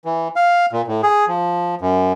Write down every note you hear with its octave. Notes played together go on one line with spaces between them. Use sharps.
E3
F5
A#2
A2
G#4
F3
F#2